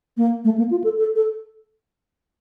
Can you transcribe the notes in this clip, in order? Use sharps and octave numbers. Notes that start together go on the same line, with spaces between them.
A#3
A3
A#3
F4
A4
A4
A4